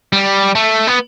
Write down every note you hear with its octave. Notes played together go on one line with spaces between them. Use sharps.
G3
A3
B3